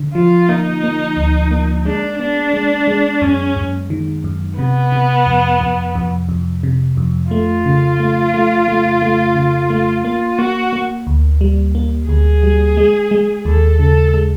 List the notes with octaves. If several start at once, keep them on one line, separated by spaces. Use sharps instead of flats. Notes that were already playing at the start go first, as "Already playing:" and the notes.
Already playing: D3
F3 F4
A#3 D#4
A#3
D2
A#3
G#3 D4
B3 D4
G#3
G#3
F#2 C#4
F#2
D#3
F#2
C3 B3
C3
F2
F2
F2
F2
C3
F2
A3 F4
C#3
A3
A3
A3
A3
C#3
A3
A#3 F4
A#3 F#4
A#3
D2
G3
A#3
D2 G#4
G3
G#3
G#3
D#2 A4
C#3 A4
G#3